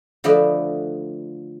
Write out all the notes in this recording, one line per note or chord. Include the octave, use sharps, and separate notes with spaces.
D3 F3 A3 B4 D5 D#5